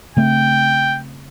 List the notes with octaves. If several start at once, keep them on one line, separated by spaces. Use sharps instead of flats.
C#3 A3 C4 G5